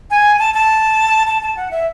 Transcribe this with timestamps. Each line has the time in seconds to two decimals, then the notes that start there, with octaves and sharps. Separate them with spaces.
0.10 G#5
0.39 A5
0.54 A5
1.27 A5
1.42 A5
1.57 F#5
1.71 E5